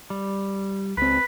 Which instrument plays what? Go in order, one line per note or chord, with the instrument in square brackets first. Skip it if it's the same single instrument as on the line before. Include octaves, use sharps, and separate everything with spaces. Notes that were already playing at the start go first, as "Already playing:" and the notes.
[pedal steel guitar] G3
[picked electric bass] C#2 C4 [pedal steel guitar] B4 [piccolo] B6